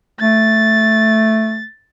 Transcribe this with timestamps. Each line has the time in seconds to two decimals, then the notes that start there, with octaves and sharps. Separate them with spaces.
0.20 A3 A6